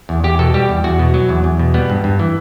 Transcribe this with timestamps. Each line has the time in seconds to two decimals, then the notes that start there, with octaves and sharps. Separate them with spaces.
0.09 E2
0.24 E2 G4
0.39 B2 A4
0.54 G3 G4
0.69 E2
0.84 E2 F#4
0.99 B2
1.14 F#3
1.29 E2
1.44 E2
1.59 B2
1.74 G3 B3
1.90 G2
2.04 G2
2.19 E3